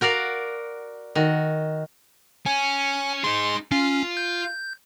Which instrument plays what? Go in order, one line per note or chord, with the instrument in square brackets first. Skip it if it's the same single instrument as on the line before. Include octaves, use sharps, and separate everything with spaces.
[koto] F#4 A#4 D5 F5 F#5
D#3 F#4
[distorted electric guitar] C#4 [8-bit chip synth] G#5
[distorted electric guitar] D#4 G#4 [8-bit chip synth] C6
[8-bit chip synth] C#4 [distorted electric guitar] F4
[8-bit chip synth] G6